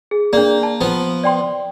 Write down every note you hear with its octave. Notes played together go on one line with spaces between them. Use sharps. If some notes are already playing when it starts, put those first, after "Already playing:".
G#4
A#3 D4 G#4 D5
A5
F3 B3
D5 G5 C6